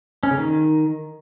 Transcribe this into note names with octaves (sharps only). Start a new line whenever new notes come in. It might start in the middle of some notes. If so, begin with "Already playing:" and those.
C#4
C#3
D#3